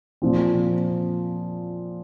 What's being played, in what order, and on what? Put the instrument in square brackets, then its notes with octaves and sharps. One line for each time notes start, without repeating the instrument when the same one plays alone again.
[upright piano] A#2 F3 C4